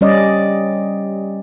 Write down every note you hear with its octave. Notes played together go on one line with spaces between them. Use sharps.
G3 C#4 D5 D#5